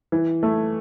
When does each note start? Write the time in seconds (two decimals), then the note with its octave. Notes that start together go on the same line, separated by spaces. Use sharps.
0.12 E3
0.43 A3